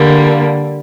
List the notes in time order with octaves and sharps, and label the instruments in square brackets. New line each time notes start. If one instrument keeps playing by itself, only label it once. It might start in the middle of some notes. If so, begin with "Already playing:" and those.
Already playing: [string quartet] D3 G3 A#3